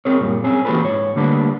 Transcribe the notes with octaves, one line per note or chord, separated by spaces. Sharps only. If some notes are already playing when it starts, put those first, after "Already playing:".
C4 G#4 A#4 C#5
F#2 A#2 G3
C4 C#4 G#4
E3 A#3 F#4 G4 A4 B4
G#2 C#5
D3 G3 A3 A#3 D4 B4